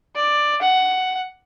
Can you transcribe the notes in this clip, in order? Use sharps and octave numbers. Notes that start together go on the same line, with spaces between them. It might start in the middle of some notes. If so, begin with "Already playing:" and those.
D5
F#5